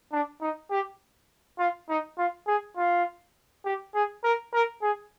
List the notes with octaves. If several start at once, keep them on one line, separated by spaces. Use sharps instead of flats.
D4
D#4
G4
F4
D#4
F4
G#4
F4
G4
G#4
A#4
A#4
G#4